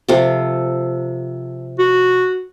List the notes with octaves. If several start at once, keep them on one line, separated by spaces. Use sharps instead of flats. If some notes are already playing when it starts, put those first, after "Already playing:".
C3 F3 A4
F#4